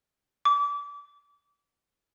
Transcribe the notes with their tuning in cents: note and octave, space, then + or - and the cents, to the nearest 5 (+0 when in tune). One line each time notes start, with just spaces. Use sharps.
D6 -30